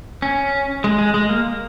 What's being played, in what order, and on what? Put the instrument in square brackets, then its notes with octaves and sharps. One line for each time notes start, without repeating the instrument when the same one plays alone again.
[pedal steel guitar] C#4
G#3
G#3
G#3
A#3